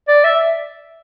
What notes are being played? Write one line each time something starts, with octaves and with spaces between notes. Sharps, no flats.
D5
E5